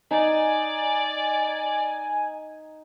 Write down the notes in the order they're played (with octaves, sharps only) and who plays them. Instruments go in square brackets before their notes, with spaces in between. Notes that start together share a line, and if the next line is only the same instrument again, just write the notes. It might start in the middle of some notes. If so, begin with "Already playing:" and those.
[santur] D#4 [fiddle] D5 [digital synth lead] G#5